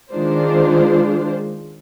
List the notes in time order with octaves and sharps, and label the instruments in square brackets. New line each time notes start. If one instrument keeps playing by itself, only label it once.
[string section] D#3 G#3 D4 F4 C5